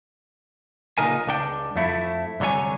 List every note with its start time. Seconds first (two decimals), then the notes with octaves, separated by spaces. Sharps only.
0.98 A#2 C#3 D#4 A#4 G#5
1.27 C#2 D4 G5
1.76 F2 A3 E4
2.40 C2 D3 F#3 C#5 G#5